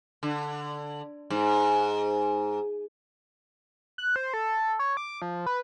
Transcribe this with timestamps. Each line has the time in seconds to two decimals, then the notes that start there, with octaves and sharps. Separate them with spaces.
0.23 D3
1.30 G#2
3.98 F#6
4.16 C5
4.34 A4
4.79 C#5
4.97 D6
5.22 F3
5.46 B4